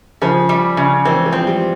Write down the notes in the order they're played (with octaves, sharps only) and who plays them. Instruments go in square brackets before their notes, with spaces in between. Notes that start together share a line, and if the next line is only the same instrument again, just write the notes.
[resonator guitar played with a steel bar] C#3 [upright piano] F3
[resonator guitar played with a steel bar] G3
C#3
[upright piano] E3 [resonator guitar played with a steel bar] C4
[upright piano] F3
[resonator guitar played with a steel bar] C4
[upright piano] G3